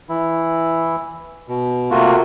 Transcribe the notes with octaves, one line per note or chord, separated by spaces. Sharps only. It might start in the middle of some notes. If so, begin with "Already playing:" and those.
E3 E4
B2
C3 A3 A#3 F4 F#4